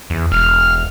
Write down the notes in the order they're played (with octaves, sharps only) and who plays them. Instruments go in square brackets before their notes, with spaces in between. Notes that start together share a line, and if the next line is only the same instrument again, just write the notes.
[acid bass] E2
[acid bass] E1 [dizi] F6